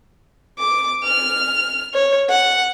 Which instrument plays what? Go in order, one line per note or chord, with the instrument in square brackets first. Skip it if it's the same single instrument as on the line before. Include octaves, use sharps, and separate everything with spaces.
[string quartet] D6
F6
C#5
F#5